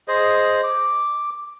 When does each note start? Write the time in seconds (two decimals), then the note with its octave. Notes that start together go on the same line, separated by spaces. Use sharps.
0.08 G#4 C5 D#5
0.63 D6